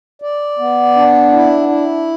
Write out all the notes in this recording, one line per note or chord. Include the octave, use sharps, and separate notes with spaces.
D5
B3
D4
E4
E4